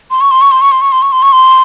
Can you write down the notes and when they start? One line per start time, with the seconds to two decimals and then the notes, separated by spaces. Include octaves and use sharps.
0.11 C6
0.21 C#6
0.31 C6
0.41 C#6
0.52 C6
0.61 C#6
0.72 C6
0.81 C#6
0.92 C6
1.02 C#6
1.12 C6
1.22 C#6
1.32 C6